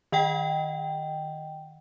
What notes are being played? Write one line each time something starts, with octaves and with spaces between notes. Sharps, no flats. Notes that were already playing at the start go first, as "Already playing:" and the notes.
D#3 D#5 F#5 G5